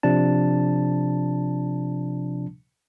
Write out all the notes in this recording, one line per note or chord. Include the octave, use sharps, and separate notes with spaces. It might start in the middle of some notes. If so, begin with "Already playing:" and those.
C3 F3 D4 A5